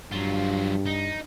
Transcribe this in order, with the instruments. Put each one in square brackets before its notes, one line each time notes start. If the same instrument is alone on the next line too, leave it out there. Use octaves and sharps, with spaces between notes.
[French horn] G2 [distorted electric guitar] F#3 F4
[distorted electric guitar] D#4